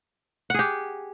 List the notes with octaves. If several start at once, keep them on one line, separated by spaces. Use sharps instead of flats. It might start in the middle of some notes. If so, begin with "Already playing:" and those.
G4 G#4 F#5